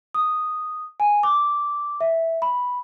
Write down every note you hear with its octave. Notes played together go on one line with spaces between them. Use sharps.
D#6
G#5
D6
E5
B5